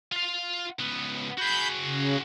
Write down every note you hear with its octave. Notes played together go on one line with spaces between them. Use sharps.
F4 F5
C#2 B3
F#4 G#4 B5 G6
C#3